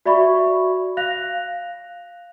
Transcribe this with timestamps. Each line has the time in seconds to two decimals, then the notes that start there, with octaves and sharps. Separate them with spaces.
0.06 F#4 D5 E5 B5 C#6
0.97 F5 F#6 A#6 F7